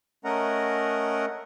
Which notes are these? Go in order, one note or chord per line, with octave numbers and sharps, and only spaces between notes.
A3 C#4 A#4 D#5 F#5 A#5